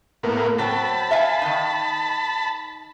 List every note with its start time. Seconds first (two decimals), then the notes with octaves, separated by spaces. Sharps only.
0.23 A2 A#3 B3
0.58 F#3 C4 A5 B5
1.11 E5 F5 G#5
1.42 D#3 D#4